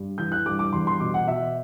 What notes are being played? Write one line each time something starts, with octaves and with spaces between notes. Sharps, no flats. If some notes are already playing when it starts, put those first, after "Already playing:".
Already playing: G2
E3 G6
F#6
G2 D6
D6
E2 C6
C6
B2 D6
F#5
B2 E5